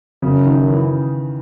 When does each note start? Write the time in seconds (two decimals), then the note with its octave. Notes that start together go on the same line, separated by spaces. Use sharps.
0.22 F#2 C#3
0.46 D#3
0.69 E3